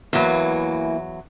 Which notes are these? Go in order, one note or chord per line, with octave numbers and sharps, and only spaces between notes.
E2 E3 F#3 A#3